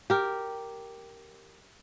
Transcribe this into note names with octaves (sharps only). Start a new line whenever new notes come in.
G4 A#4